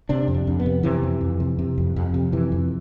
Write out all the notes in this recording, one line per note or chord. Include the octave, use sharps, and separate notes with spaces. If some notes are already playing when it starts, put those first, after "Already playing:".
C3 D4
F2
D4
F2
B3
C3
C3 E3
F2
F2
C3
C3
F2
F2
C3
C3 E3
F2